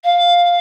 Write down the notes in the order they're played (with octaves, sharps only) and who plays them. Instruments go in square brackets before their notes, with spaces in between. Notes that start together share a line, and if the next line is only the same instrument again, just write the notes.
[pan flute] F5